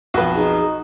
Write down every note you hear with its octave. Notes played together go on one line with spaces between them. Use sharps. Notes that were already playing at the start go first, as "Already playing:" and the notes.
B1 F2 F#4 B4
D#4 G#4